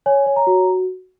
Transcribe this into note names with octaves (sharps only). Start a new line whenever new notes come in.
C#5 G#5
C#5
A#5
F#4